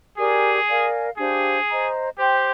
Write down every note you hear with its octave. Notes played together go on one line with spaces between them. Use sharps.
G4 G#4 A#4 D5 G#5
A#4 D5 F5 G#5
D4 G4 G#4 C5 F5
C5 D#5 A#5
G4 C5 G5 C6